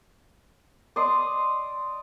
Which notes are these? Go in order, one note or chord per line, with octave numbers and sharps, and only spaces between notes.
D5 D#5 C6